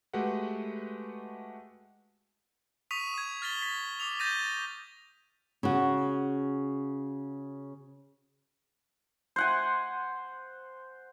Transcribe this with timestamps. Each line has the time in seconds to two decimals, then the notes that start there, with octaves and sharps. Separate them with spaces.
0.13 G#3 A3 F#4 G4 B4 F#5
2.91 C#6 D#6 B6 D#7 F7
3.14 D#6 G#6
3.42 F6 A6 B6 G7
3.62 B6
4.00 D6 D#6 F7
4.19 G6 A6 A#6 D#7 G7
5.63 C#3 F#4
9.36 C5 F#5 G#5